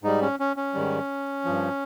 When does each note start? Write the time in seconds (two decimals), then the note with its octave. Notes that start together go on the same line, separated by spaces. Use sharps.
0.03 G#2 G3 D#4
0.21 C#4
0.40 C#4
0.57 C#4
0.74 G#2 D#3 G3
1.45 G2 F3